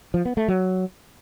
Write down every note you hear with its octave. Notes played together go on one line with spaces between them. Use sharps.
F3
B3
A3
F#3